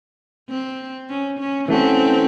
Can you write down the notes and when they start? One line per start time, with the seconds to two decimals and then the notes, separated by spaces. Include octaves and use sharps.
0.49 C4
1.09 C#4
1.39 C#4
1.68 E3 A3 C4 C#4 F#4